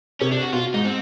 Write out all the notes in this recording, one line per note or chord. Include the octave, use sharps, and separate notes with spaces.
C3 C#4
D4
F#4
B2 F4
G#2 D#4
C4